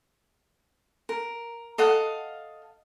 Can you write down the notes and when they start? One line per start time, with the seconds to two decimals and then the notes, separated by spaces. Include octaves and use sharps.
1.09 A#4
1.78 A4 D#5 F5 F#5